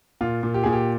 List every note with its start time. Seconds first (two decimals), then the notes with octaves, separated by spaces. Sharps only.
0.21 A#2 F4
0.43 A#2
0.54 G4
0.63 A#2 G#4
0.73 G4